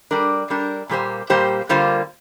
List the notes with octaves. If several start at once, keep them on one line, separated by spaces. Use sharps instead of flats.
G3 D4 A#4
G3 D4 A#4
A#2 G3 A#3 G4 C5
A#2 G3 A#3 G4 C5
D3 G3 A#3 F4 C5